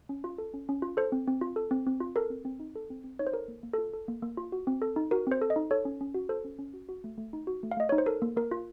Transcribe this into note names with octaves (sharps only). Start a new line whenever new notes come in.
C#4
F4
A4
C#4
C#4
F4
A4 C5
C4
C4
F4
A4
C4
C4
F4
A4 A#4
C4
C4
D#4
A4
C4
C4
D#4 C#5
C5
A4 A#4
A#3
A#3
F4 A4
A4
A#3
A#3
F4
F#4
C4
A4
D#4
F#4 A#4
C4 C5
A4
D#5
D#4
A4 C#5
C#4
C#4
F#4
A4 C5
C#4
C#4
F#4
F#4
A3
A3
D#4
F#4
A3
F5
A3 D#5
D#4 C#5
C5
A4 A#4
A#3
A#3 A#4
F4